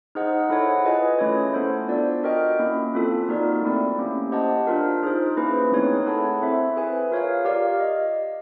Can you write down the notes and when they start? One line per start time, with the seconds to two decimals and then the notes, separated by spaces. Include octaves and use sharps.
0.15 D#4 G#4 C5 D#5 F#5
0.50 E4 A4 C#5 F#5
0.85 F4 G#4 B4 D#5 G#5
1.19 A3 C#4 E4 A4 C#5
1.54 B3 E4 A4 C5
1.89 D4 F4 A4 D5
2.24 F#4 A#4 D#5 G5
2.59 A#3 C#4 E4
2.94 C4 F4 A4
3.29 A#3 D#4 F#4 A#4 D5
3.62 A3 C4 E4 A4 D5
3.98 A#3 C#4 E4 G4
4.32 G4 C5 D#5 F#5 A5
4.67 D4 F4 A#4
5.03 D#4 G#4 C5
5.37 A#3 C#4 E4 G#4 B4
5.72 A3 C4 D#4 G#4 C#5
6.06 E4 A4 C#5 F#5 A5
6.41 C4 E4 A4 C5 E5
6.77 G#4 B4 E5 G#5
7.11 F4 A#4 C#5 F5
7.45 G4 A#4 D5 F5
7.80 D#5